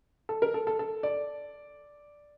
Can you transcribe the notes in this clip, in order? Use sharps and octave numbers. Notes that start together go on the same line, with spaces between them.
A4
A#4
A4
A4
A4
D5